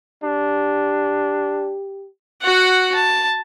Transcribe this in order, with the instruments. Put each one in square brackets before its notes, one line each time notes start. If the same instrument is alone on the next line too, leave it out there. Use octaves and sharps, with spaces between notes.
[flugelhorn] D4 [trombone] G4
[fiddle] F#4 F#5
A5